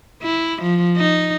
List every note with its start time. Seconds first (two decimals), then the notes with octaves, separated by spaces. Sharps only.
0.22 E4
0.63 F3
0.97 D#4